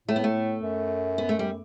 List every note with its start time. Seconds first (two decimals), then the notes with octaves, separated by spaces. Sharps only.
0.08 A2 A3
0.16 B3
0.24 A3
0.63 F#2
1.18 B3
1.29 A3
1.39 G3